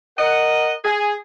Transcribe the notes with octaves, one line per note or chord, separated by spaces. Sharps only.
A#4 D#5 F#5
G#4